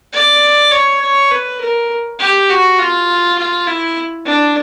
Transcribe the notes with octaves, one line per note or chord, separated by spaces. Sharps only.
D5
C#5
C#5
B4
A#4
G4
F#4
F4
F4
E4
D4